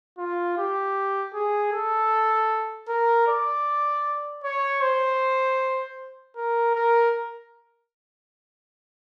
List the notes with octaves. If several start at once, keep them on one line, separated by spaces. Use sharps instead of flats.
F4
G4
G#4
A4
A#4
D5
C#5
C5
A#4
A#4